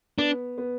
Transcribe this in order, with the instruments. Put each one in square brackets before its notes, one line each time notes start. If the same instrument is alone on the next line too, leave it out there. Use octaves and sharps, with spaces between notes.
[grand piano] B3 [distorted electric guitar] D4
[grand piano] B3